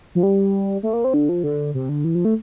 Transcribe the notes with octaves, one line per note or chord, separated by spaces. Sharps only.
F3
G3
A3
A#3
C4
D3
F3
D3
C3
D3
E3
F3
A3